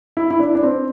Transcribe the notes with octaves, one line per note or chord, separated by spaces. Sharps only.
E4
E4
D4
D4
C4